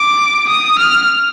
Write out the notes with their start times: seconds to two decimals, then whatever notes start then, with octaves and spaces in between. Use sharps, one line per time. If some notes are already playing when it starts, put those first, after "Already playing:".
Already playing: D6
0.49 D#6
0.79 F6